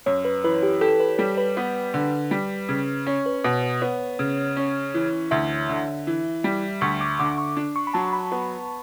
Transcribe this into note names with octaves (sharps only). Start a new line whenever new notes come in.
F#2 C#5
B4
E3 B4
G4
G4 A4
B4
G3 A4
B4
B3
D3
G3
C#3
C#4 C#5
B4
B2 B4
B4
B3 C#5
C#3
C#4
E3
D2 E5
D3
E3
G3
D2 C#6
D6
D3 D6
C#6
D4
C#6
B5
F#3 A5
B5
B3